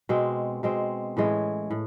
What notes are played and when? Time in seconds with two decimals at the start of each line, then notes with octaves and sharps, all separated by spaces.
0.09 B2 G#3 C4
0.63 B2 G#3 C4
1.17 A2 E3 G#3 C#4
1.71 A2